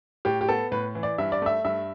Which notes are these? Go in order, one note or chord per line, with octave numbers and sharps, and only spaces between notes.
A2 G4
G4
B3 A4
A2 B4
E3
D5
G2 E5
D5
A3 E5
G2 E5